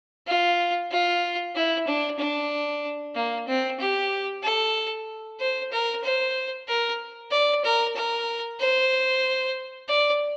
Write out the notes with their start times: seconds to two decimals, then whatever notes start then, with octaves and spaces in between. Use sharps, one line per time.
0.27 F4
0.92 F4
1.55 E4
1.87 D4
2.19 D4
3.15 A#3
3.47 C4
3.80 G4
4.43 A4
5.40 C5
5.72 A#4
6.04 C5
6.68 A#4
7.31 D5
7.64 A#4
7.96 A#4
8.60 C5
9.89 D5